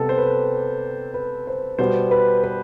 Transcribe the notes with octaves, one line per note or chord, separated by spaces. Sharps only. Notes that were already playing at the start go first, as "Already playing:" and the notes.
Already playing: C3 G3 B3 G4 A4
C5
B4
B4
C5
B2 G3 B3 C5
B4
B4